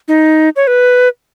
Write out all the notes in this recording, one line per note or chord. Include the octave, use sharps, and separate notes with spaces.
D#4
C#5
B4